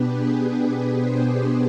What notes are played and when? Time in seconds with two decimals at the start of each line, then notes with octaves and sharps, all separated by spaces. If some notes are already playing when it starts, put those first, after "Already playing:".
Already playing: B2 B3 D4 G4 B4
0.12 G#4
0.41 G4
0.98 G#4 C5
1.27 G#4 C5